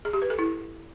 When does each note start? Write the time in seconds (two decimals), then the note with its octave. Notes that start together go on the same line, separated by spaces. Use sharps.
0.05 G#4
0.13 G4
0.22 B4
0.30 A4
0.39 E4